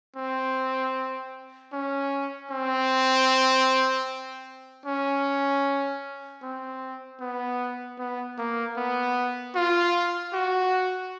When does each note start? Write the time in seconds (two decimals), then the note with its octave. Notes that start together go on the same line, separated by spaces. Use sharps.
0.16 C4
1.73 C#4
2.51 C4
4.86 C#4
6.42 C4
7.20 B3
7.99 B3
8.38 A#3
8.77 B3
9.55 F4
10.33 F#4